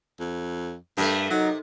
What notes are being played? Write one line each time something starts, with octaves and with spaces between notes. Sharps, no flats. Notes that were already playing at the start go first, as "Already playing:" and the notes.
F2
G2 A3 A#3
C3 F#3 D#4